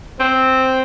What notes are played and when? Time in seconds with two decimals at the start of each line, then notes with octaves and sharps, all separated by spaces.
0.19 C4